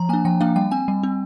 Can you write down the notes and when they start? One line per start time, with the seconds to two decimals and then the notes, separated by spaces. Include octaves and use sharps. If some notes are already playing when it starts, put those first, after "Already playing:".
Already playing: F3 A#5
0.09 A#3 D4 G#5
0.25 F3 G5
0.41 A#3 D4 F5
0.56 G3 G5
0.71 C4 G#5
0.88 G3
1.03 C4